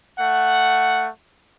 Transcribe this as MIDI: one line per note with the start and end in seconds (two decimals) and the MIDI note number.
0.19 1.09 57
0.19 1.09 78